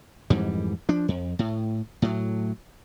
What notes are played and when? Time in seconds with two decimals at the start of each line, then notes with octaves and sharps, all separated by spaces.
0.30 F2 G#2 E3 G3
0.89 F3 D4
1.08 F2
1.39 A2
2.02 A2 F#3